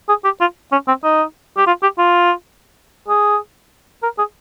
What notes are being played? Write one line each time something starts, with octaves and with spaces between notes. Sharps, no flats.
G#4
G4
F4
C#4
C4
D#4
G4
F4
G4
F4
G#4
A#4
G#4